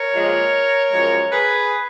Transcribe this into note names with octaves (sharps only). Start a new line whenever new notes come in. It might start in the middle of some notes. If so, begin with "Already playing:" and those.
Already playing: A#4 C#5
A#2 F3 G#3
F#2 F3 G#3
G#4 B4